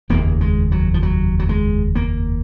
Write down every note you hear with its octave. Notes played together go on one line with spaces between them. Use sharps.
F1 D#2 C#3 A#3
G#3
F#3
F3
F#3
F#3
G#3
A#3